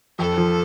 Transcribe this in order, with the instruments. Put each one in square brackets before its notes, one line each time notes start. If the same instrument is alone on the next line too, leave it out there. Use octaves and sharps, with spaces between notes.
[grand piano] F2 [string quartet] A4
[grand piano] F3